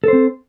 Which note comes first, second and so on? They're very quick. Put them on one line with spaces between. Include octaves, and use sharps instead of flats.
A4 C5 C4